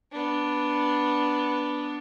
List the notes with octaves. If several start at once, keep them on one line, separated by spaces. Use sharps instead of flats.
B3 D4